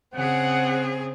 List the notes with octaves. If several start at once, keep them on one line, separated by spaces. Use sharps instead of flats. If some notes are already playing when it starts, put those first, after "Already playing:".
C#3 C4 G#4 F#5